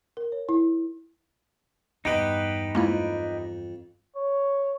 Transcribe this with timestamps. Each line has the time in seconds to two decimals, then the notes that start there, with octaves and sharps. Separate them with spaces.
0.17 A#4
0.32 C#5
0.49 E4
2.05 E2 G2 B3 D#4 G4 B4 D#5
2.75 F2 G#3 A#3 E4
4.16 C#5